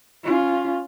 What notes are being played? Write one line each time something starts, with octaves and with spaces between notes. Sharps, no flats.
C#4 F4